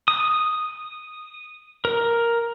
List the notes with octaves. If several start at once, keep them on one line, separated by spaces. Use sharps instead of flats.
D#6
A#4